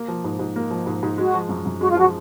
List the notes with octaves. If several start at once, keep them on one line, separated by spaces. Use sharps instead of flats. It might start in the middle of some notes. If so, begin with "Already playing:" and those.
Already playing: A#3
F3
G#2
G#2
A#3
F3
G#2
G#2
G#3 F#4
F3
F#2
F#2
G#3 F#4
F4
F3 F#4